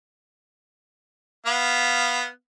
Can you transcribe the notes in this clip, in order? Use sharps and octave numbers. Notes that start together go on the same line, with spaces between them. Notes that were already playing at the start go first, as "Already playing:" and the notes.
B3 F5